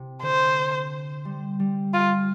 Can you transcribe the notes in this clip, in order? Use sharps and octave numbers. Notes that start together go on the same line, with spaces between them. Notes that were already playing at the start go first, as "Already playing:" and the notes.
Already playing: C3
D3 C5
G3
G3
F4